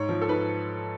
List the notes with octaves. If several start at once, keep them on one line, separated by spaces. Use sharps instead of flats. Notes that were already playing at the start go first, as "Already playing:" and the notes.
Already playing: G#2 C#5
F3
A4
G#2 B4